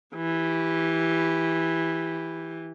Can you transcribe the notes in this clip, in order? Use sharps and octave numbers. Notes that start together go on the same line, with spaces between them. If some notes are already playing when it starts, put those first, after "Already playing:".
E3 G4